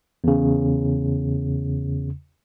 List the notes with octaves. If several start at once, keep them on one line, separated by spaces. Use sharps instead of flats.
E2 C#3